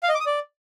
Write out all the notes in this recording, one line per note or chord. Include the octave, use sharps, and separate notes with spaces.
F5
D#5
D6
D#6
D5